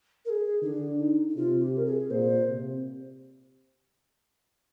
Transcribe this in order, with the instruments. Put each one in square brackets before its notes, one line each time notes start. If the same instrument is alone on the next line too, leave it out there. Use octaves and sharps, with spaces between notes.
[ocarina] A#4
G#4
[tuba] D3 [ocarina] D#4
[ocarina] D4
D#4
D#4
[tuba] C3 [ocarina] F4
[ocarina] G4
A#4
G#4
[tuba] A#2 [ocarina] C5
[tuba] C3